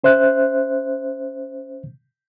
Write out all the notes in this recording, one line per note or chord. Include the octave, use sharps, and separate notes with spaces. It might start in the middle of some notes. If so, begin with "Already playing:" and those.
C#4 C5 E5 F#6